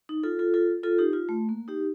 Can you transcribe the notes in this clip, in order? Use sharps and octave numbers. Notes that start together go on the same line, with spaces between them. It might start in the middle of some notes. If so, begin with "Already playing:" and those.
D#4
F4 A4
F4 A4
F4 A4
F4 A4
D#4 G4
F4
A3
A#3
D#4 G4